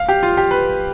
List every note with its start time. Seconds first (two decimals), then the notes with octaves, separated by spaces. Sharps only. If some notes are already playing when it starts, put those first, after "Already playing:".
Already playing: F5
0.09 G4
0.23 F4
0.37 G4
0.51 B4